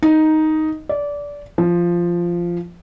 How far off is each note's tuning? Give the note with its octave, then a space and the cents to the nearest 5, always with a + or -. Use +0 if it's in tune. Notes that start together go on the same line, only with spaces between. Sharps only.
D#4 +5
D5 -20
F3 -10